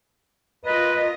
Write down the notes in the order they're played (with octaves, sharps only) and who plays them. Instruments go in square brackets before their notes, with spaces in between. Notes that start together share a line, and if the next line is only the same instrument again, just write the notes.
[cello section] F4 A#4 D#5 [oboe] B4